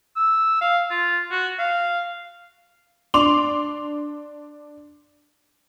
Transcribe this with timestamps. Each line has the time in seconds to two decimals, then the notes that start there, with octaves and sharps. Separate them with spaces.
0.16 E6
0.61 F5
0.91 F4
1.31 F#4
1.59 F5
3.14 D4 C6 D6 F7 F#7